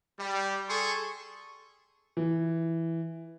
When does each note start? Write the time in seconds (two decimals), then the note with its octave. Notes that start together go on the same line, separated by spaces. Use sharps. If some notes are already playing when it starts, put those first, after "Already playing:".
0.20 G3
0.69 G#4 A4 C6 C#6
2.17 E3